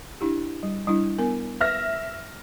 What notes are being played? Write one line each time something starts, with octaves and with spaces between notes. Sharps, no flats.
D4 E4 G4
G3
G3 D4 E4
B3 A#4 G#5
B4 E5 F6 A#6